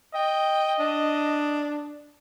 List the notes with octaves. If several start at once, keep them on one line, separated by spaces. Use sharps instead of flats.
D#5 G5
D4